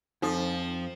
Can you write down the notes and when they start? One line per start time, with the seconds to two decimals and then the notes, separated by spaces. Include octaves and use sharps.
0.22 F2 F3 D#4 A4